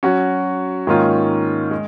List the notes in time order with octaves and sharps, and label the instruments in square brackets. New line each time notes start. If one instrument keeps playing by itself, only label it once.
[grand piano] F#3 C#4 F#4
G#2 D#3 A#3 C#4 F4
G#3